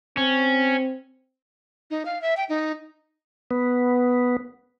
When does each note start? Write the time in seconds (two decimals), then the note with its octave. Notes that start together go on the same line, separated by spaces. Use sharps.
0.17 C4 C#4
1.91 D#4
2.06 F5
2.22 E5
2.37 G5
2.49 D#4
3.51 B3